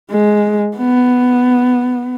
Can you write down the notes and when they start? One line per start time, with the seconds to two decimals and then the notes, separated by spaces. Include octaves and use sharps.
0.11 G#3
0.77 B3